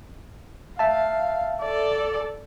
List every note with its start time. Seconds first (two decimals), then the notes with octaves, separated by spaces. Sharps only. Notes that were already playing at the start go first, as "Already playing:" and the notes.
0.79 E5 F5 A5
1.62 A4 D5